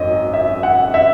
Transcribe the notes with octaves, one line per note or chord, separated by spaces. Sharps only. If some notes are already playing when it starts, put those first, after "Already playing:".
Already playing: G#1 F#2 D#5
E5
F#5
E5